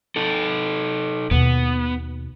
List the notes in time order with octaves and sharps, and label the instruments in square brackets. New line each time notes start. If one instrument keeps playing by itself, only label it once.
[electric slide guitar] D#4 A4
[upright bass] D#2 B2 [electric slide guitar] B3